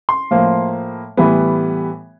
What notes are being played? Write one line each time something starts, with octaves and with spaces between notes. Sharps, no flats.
C6
A2 F3 A#3
A2 E3 G3 B3